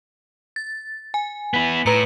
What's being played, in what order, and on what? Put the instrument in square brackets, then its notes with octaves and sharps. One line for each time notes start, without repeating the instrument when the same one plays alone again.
[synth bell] A6
G#5
[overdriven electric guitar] B3 E4
[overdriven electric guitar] A2 [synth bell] B4 A#5 C#7